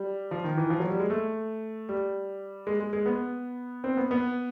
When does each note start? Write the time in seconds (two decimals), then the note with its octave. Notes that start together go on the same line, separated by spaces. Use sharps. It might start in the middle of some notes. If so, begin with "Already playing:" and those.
Already playing: G3
0.31 F3
0.44 D#3
0.57 E3
0.70 F3
0.80 F#3
0.90 G3
1.00 G#3
1.10 A3
1.89 G3
2.67 G#3
2.80 G#3
2.93 G#3
3.06 B3
3.84 C4
3.97 B3
4.11 B3